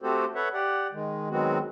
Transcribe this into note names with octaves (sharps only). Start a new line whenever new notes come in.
A3 C4 F#4 G4 A4 C5
A4 B4 C#5 E5 F#5
G4 D5 F#5
D#3 G#3
D#3 F#3 G#3 B3 C4 F#4